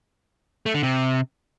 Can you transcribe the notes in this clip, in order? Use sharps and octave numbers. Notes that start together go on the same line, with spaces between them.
A3
D3
C3